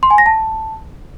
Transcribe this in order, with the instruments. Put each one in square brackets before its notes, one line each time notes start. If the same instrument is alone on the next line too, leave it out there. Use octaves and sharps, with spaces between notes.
[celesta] C6
G#5
A#6
A5